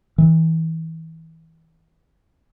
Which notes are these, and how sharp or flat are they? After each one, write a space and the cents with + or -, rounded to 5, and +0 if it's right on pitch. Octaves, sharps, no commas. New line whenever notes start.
E3 -30